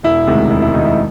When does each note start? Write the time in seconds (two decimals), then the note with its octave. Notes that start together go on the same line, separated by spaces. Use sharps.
0.03 E1 E4
0.27 D2 C3 D#3 G#3
0.50 E1 E4
0.62 E4
0.73 D2 C3 D#3 G#3 D#4
0.86 E4